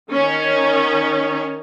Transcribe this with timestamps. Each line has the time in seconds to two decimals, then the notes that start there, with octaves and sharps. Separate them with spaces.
0.11 D#3 C#4